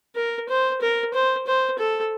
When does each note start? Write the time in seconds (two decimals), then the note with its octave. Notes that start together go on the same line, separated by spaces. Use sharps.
0.16 A#4
0.49 C5
0.81 A#4
1.14 C5
1.47 C5
1.79 A4